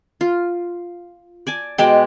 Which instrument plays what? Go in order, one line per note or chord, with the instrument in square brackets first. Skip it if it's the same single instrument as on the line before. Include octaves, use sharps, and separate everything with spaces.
[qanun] F4
D5 G#5 A5
[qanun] B2 G#3 D5 [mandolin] G4